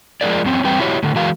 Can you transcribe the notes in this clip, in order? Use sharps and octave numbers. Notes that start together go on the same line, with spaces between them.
F3 G#3 D#4 F#4 A#4 D5
F#2 C4 C#4
E2 G3 C4 B4 G5
E4 F#4 G4 C#5
A2 D3
E3 G#3 F#4 A#4 F5